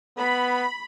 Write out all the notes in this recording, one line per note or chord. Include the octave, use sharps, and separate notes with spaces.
B3 B5